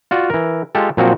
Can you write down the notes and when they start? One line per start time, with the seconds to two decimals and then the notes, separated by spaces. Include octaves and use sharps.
0.11 F4 F#4 D5
0.30 E3 A#4
0.75 G#3 F4 G4 A4
0.97 A#2 F3 F#3 C4 F#4